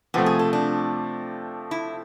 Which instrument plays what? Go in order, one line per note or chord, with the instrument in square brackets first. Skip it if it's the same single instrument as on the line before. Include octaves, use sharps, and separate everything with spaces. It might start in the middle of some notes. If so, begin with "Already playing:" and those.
[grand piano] C3 F3 A3 [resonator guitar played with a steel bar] B3
[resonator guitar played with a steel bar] G#4
A4
D4
E4